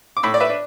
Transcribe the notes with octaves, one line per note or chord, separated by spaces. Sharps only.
D6
A2 B5 E6
D5
B4 E5
D4